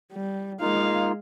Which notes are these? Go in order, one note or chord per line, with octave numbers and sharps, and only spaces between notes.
G3
G#3 A#3 D#4 F4 F5